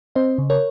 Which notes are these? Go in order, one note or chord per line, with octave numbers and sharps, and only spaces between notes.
C4 C5 D#5
C#3
A#4 C#5